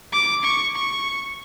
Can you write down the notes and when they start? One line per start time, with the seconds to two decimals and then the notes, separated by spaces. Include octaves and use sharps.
0.12 D6
0.43 C#6
0.75 C#6